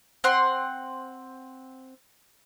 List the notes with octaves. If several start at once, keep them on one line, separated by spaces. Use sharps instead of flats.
C4 F#5 C6